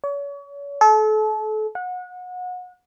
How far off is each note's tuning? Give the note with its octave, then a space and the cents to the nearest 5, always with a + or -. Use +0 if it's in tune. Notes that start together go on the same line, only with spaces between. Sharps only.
C#5 +35
A4 -35
F#5 -30